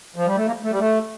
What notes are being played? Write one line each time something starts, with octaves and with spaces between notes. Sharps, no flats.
F3
G3
A3
A#3
A3
G3
A3